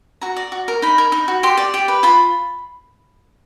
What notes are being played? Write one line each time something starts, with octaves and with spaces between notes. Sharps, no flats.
F#4 A#5
D5
F#4
A#4
D#4 B5
A#4
D#4
F#4
G4 C6
D5
G4
B4
F4 B5